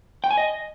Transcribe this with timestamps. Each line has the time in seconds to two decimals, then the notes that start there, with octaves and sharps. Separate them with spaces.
0.24 G5
0.31 G#5
0.37 D#5